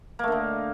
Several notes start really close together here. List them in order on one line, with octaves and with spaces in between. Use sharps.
A#3 A3 D3 D#4